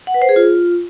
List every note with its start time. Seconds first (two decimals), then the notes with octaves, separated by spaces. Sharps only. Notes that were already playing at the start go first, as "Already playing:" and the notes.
0.07 F#5
0.14 B4
0.22 C5
0.29 G#4
0.36 F4